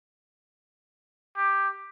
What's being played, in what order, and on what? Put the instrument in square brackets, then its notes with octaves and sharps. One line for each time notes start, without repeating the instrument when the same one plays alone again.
[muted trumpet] G4